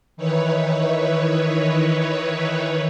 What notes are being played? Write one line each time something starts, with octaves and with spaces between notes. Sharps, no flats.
D#3 E3 D#4 E4 B4 C#5